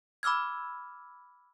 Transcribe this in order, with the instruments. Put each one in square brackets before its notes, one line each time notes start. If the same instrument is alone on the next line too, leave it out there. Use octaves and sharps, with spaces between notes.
[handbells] B5 D6 E6 F6 G#6